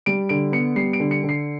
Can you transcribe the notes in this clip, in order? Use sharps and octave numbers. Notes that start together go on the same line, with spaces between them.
G3 D7
D3 D7
B3 C#7
G3 C7
D7
D3
C#7
D3
C7